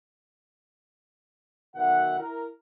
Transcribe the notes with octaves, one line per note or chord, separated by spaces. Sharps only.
B1 B2 D#3 F#4 E5 F#5
E4 A#4